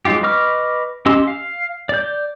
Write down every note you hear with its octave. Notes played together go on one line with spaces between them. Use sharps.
F#3 G#3 D#4 F4 G4
B4 D#5 C#6 D6 F6
C#4 G4 D#5 C6 E6
F5
D5 G6